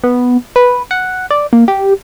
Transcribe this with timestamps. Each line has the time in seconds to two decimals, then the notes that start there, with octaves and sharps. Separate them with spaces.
0.04 B3
0.56 B4
0.91 F#5
1.31 D5
1.53 A#3
1.68 G4